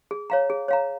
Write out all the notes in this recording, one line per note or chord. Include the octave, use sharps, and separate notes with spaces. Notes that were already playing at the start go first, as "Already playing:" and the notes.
G#4
C#5 F5 A#5
G#4
C#5 F5 A#5